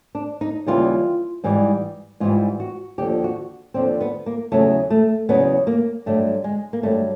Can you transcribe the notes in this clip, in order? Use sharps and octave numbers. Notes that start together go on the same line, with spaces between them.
D4
D#4
D#2 C#3 E3 G3 F4
G#2 E3 G3
G#2 E3 G3 F4
F#4
D#2 D3 F3 G4
F#4
D#2 D3 F3 C4
B3
A#3
E2 C#3 F#3 A3
A3
E2 C#3 F#3 B3
A#3
G2 D3 F#3 A3
G#3
A#3
G2 D3 F#3 A3